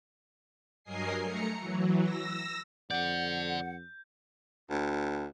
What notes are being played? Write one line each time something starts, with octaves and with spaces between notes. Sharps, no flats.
G2 F#3 A#4 D#5 G#5 C7
A3 A#5 C#7
E3 F#3
E6 A#6
F2 A4 D5 F#5 G6
D2